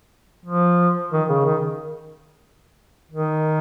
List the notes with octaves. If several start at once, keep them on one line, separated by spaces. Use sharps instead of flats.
F3
D#3
C#3
D#3
D#3